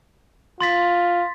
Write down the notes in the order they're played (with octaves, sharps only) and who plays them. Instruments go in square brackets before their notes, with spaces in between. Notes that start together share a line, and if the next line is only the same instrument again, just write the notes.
[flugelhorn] F4 [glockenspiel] C6 A6 B6